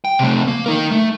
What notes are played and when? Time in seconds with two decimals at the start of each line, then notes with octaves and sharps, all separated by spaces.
0.05 G5
0.19 C3 A3
0.48 A#3
0.66 D#4 A#4
0.91 A3